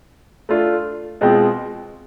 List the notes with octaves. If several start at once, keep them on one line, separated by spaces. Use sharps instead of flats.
A3 D4 F4
B2 G#3 C4 F4